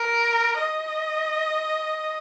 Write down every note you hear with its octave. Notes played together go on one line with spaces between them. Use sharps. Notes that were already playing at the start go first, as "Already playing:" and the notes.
Already playing: A#4
D#5